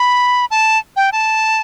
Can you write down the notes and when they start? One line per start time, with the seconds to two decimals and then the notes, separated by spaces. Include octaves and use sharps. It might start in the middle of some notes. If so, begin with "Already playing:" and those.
Already playing: B5
0.51 A5
0.96 G5
1.12 A5